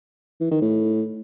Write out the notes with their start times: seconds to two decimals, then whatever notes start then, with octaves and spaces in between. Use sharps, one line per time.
0.41 E3
0.51 D#3
0.62 A2